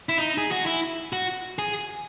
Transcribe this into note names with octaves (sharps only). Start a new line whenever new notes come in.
E4
D#4
G#4
F#4
E4
F#4
G#4